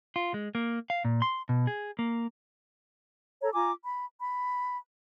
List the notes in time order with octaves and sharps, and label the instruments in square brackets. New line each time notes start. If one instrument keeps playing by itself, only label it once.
[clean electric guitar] F4
G#3
A#3
F5
A#2
C6
B2
G#4
A#3
[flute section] A4 C#5 A#5
F4 G#5 A#5 D6
B5
B5